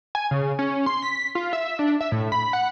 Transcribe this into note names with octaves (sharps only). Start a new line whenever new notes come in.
G#5
C#3
C#4
C6
B6
F4
E5
D4
E5
A2
B5
F#5